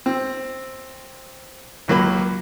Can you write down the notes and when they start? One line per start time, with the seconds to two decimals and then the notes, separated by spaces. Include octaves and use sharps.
0.06 C4
1.88 C#2 F#3 A#3 B5